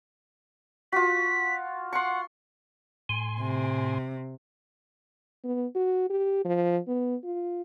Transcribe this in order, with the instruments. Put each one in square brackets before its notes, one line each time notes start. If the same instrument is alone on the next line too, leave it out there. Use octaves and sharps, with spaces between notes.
[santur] F4 F#4 [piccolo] B6
[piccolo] F#5 [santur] C6 C#6
[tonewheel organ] A2 G#5 C6
[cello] C3
[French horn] B3
F#4
G4
F3
B3
F4